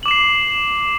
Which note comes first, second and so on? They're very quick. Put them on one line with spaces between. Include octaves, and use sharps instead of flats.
F#7 D6 E7 C7